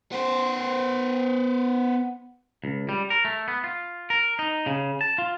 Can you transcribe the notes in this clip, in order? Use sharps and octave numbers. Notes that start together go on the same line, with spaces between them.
B3 C5
C#2
G3
A#4
A3
B3
F4
A#4
D#4
C#3
A5
F4